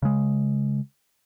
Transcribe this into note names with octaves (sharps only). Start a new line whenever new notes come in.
C#3 G#3